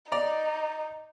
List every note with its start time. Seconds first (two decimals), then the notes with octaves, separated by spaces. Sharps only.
0.12 D#4 D5 A#5